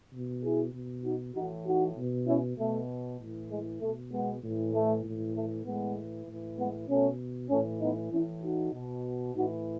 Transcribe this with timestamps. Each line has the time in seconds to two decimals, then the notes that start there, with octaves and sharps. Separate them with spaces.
0.12 B2
0.43 E4 G#4
0.74 B2
1.04 D#4 F#4
1.35 A2 E3 D#4 F#4
1.66 D#4 F#4
1.97 B2
2.27 C#4 E4
2.58 B2 A3
3.19 A2 E3
3.50 G#3
3.81 B2 A3
4.12 G#3 B3
4.43 A2 E3
4.74 A3
5.04 A2 E3
5.35 A3
5.65 A2 E3 G#3 B3
6.27 A2 E3
6.58 G#3 B3
6.88 B2 A3 C#4
7.50 A2 E3 A3 C#4
7.81 B3 D#4
8.12 A2 E3 C#4 E4
8.42 D#4 F#4
8.73 B2
9.34 A2 E3 D#4 F#4